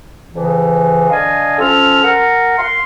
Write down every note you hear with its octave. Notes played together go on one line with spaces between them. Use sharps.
F2 C#3 E3
D3 D#5 F5 G#5
F3 C#4 A4 F6
A#4 F#5
F5 C6